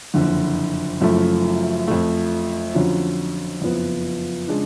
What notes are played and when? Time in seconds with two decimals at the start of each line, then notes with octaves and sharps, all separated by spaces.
0.14 F#1 F2 D3
1.01 F#1 F#2 F3 A3
1.88 F2 F3 A3
2.74 F2 D3 F#3 C#4 F4
3.61 F#1 F2 F3 B3
4.47 C#3 G#3 D4 F4